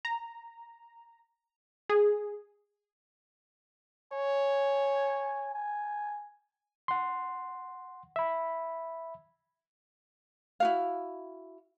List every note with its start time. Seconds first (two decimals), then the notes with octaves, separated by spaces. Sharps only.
0.05 A#5
1.89 G#4
4.13 C#5 G#5
5.54 G#5
6.88 F#5 C6
8.16 E5 B5
10.60 E4 F#4 F5